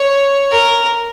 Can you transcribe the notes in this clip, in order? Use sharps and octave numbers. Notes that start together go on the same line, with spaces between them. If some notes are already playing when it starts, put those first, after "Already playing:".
Already playing: C#5
A#4